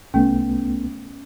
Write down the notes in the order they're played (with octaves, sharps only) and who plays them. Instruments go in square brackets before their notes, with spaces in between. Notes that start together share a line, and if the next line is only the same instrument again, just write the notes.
[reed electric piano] C2 A3 B3 [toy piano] C#4